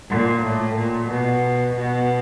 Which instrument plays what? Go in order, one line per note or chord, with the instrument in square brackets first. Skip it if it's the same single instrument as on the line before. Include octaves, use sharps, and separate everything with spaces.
[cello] A#2
A2
A#2
B2
B2